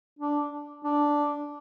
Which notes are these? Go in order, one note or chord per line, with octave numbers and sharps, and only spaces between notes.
D4
D4